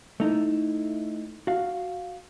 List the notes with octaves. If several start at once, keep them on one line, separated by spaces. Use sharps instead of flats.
A3 D#4 E4
F#4 F5